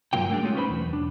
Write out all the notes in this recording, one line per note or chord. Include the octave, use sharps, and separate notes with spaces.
G2 E3 F#3 A#3 F4 G5
A3 A#3 C4 D4 G#4
G#3 A3 C#4 F4
C#4 D#4 B4 C5 F5 B5
B1 E2
D4